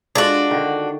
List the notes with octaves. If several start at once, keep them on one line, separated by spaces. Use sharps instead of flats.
G#3 D4 F4 F#4 A4
D3 D#3